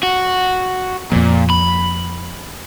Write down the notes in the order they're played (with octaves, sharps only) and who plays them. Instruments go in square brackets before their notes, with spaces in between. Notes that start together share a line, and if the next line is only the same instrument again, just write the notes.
[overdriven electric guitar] F#4
[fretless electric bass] F2 F3 [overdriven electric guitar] A#2
[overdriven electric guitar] B5